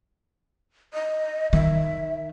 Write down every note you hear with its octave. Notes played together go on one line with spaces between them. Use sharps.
D#5
D#3 E5